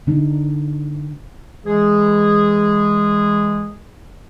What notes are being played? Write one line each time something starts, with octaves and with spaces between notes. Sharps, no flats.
D3 D4 D#4
E3 G#3 G#4